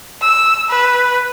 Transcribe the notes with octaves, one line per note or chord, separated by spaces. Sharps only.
E6
B4